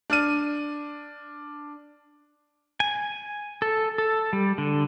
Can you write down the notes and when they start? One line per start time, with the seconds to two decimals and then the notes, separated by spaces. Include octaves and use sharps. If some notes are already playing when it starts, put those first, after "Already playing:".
0.10 D4 F6 D#7
2.80 G#5
3.62 A4
3.98 A4
4.33 G3
4.58 D3